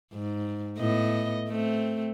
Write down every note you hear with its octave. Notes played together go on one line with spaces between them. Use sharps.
G#2
A2 B3 D#5
A3 C4